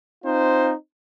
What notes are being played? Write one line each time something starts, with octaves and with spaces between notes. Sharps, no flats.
C4 D#4 F4 C5